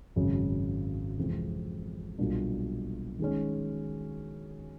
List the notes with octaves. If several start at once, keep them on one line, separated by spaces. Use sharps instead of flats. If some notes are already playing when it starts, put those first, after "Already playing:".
G#1 F#2 C#3
F2 C3 E3 G#3 C4
B1 A#2 G3 A#3 D4
D#3 G#3 C#4